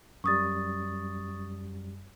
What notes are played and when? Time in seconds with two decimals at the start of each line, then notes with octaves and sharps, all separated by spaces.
0.24 F#2 G3 C#6 D#6 A6